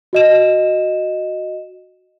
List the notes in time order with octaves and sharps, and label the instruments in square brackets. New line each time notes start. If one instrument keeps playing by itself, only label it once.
[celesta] F#4 D#5 E7